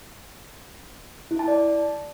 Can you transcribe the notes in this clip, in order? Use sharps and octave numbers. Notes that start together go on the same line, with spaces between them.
E4
A5
D5